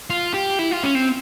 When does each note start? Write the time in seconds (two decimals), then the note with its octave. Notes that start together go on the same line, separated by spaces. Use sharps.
0.10 F4
0.34 G4
0.59 E4
0.71 F4
0.83 C#4
0.95 C4